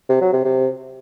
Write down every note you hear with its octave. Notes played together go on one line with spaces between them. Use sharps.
C3
F#3
C3
C3